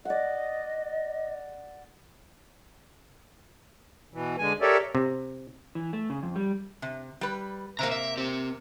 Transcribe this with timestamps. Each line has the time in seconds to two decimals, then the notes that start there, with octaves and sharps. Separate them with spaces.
0.05 D5 D#5 F#5
4.14 B2 E3
4.39 D3 G#3 G#5
4.62 G4 A4 A#4 C#5 D5 E5
4.95 C3
5.75 E3
5.93 A3
6.10 C#3
6.23 F2
6.36 G3
6.82 C3
7.21 G3 B4
7.79 C3 A#3 C5 A#5
7.92 E5
8.18 C4 G4